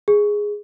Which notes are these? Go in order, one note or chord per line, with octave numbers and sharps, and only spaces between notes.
G#4